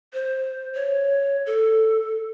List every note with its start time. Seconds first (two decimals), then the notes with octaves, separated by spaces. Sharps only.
0.13 C5
0.75 C#5
1.46 A4